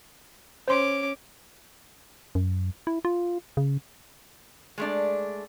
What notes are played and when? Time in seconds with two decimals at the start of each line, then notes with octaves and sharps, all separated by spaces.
0.68 C#4 C5 C6 D6
2.35 F#2
2.87 E4
3.05 F4
3.57 C#3
4.78 G#3 A3 D4